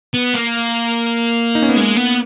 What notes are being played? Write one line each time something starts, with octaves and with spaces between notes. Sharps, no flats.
B3
A#3
D#4
C#4
B3
G#3 A#3
B3